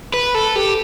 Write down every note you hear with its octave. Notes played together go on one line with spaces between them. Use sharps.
B4
A4
G4